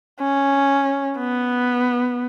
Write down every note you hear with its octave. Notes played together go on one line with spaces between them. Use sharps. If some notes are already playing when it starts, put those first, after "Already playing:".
C#4
B3